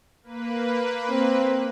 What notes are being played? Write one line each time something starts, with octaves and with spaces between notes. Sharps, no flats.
A#3 B4
C4